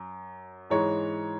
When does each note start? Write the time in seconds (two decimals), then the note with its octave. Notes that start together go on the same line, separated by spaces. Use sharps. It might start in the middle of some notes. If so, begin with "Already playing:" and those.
Already playing: F#2
0.70 G#2 E3 G#3 C#5